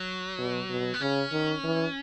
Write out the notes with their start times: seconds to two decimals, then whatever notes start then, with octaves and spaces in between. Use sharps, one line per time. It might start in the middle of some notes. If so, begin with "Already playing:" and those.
Already playing: F#3
0.38 B2
0.69 B2
0.94 B3
1.01 C#3 C#4
1.32 D#3
1.64 E3